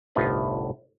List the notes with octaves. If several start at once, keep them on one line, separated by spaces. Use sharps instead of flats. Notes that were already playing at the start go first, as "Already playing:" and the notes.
G1 C2 A2 D#4 F4 B4